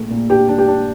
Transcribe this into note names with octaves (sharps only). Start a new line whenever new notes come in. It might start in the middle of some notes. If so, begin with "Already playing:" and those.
Already playing: A#1 A#2 A3
A#2
D4 G4
D4
G4
D4